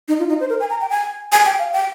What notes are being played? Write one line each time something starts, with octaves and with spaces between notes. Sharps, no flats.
D#4
F4
D#4
C5
A#4
G#5
A#5
G5
G#5
G#5
G5
F5
G5